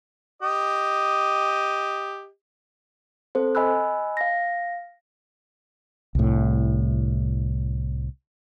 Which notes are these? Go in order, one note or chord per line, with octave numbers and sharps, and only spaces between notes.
G4 D#5
C4 A4 C5
D#5 G#5 B5 E6 F#6
F5 A#6
C2 A2